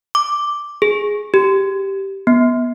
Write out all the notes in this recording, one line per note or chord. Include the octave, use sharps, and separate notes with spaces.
D6
G#4
G4
B3